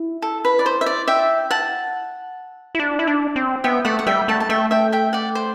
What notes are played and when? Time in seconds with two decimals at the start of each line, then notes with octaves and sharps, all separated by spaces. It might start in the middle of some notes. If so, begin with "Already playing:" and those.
Already playing: E4
0.22 A4
0.45 B4
0.59 D5
0.66 C5
0.81 E5
0.86 D5
1.08 E5 G5
1.51 F#5 A5
2.75 E4
2.79 D4
2.99 E4
3.07 D4
3.36 C4
3.64 B3 E5 G5
3.85 A3 D5 F#5
3.99 F#5
4.07 G3 E5 G5
4.28 A3 F#5 A5
4.40 A5
4.49 A3 E5 G5
4.71 E5 G5
4.92 E5 G5
5.13 D5 F#5
5.35 C5